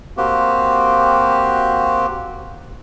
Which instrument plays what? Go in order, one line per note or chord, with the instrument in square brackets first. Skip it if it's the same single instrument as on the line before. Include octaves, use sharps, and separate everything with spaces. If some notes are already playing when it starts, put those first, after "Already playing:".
[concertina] A#3 C4 F#4 G4